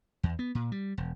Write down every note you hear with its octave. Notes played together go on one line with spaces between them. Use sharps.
E2
B3
A#2
G3
E1